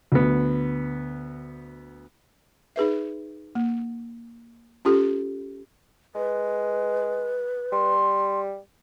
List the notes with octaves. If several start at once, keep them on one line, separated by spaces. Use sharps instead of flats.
D2 B3
D#4 G#4 B4 E5
A#3
C#4 F4 G4 A4
G#3 B4
G3 C6